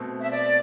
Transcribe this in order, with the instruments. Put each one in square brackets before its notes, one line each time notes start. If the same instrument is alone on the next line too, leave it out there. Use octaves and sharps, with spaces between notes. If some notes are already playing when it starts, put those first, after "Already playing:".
Already playing: [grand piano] B2 A3 C4
[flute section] E5
D5